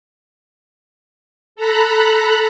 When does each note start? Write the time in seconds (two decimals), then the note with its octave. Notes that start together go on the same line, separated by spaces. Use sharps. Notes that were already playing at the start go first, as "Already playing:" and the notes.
1.56 A4 A#5 B5 F#6